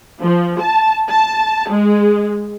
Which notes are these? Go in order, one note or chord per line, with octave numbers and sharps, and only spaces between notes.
F3
A5
A5
G#3